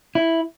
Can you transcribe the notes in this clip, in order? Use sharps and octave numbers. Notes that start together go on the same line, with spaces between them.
E4